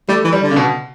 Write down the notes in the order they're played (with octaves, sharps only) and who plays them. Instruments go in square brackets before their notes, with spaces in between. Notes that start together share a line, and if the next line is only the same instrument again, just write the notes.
[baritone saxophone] G3 [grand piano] A3
[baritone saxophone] E3
[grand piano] G3
[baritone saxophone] D3
[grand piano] C#3
B2